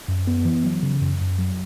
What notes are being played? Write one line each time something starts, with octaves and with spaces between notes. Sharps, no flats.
F#2
B3
E3
F#3
C#3
F#2
F#2
F#3